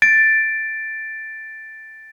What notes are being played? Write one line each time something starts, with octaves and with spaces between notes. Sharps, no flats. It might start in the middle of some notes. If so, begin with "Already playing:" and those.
A6 D7